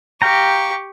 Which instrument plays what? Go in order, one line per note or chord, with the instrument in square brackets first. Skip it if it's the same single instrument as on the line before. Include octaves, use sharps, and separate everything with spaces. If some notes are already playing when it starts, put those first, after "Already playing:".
[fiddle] G4 C#6 [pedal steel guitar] F5 G5 A#5